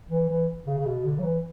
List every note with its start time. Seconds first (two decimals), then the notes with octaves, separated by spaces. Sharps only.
0.10 E3
0.29 E3
0.67 C#3
0.77 C#3
0.85 B2
1.05 D3
1.19 F#3
1.23 E3